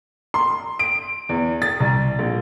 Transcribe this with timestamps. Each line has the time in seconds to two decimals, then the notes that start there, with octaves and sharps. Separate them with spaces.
0.34 C6
0.79 D7
1.29 E2
1.62 A6
1.80 C2
2.19 A#1